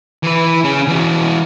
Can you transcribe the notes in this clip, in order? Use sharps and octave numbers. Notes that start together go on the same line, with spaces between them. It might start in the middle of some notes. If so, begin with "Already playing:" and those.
E3 B4
C#4 G#4
E3 F#4